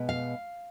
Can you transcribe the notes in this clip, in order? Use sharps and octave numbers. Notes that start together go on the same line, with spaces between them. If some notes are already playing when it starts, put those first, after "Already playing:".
Already playing: B2 G#3 B3
F5